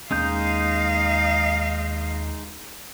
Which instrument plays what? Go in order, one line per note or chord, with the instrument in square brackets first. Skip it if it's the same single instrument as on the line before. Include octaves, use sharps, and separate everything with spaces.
[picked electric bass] D#2 A#3 C#4 [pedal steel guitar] G#3 D#4 G6 [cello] D#5 F5